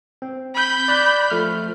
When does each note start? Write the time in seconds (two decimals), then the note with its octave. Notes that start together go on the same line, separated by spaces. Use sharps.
0.22 C4
0.55 B5 G6
0.88 D5 F#6
1.30 F3 A3 F6